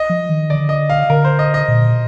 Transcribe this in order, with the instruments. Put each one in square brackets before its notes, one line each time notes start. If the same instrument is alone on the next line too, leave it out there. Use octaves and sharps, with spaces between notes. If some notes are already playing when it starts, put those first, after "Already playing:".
Already playing: [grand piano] D#5
[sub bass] F3
D#3
[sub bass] D3 [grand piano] D5
[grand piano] D#5
F5
[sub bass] D3 [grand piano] A#4
[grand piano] C5
D#5
D#5
[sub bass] A#2